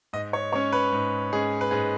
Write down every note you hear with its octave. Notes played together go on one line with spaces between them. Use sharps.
G#2 D#5
C#5
G#3 C#4 C#5
B4
G#2
G#3 C#4 G#4
B4
G#2 G#4